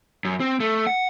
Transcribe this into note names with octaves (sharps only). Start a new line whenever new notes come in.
F#2
C4
A3
F#5